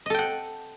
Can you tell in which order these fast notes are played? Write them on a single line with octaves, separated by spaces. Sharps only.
D#5 A4 G5 F#5